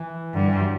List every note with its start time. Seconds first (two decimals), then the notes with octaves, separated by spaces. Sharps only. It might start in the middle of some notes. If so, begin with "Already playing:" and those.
Already playing: E3
0.34 G2 D3
0.48 E3
0.61 F#3